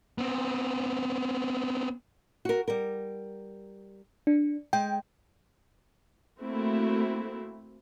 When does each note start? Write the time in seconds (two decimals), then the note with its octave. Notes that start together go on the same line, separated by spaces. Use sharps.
0.18 B3 C4
2.45 F#4 A#4
2.68 G3 A#4
4.27 D4
4.73 G#3 G5
6.40 A3 A#3 C4 E4 F#4